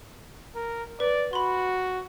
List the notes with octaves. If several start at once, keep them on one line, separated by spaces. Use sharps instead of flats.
A#4
B4 D5
F#4 B5 C6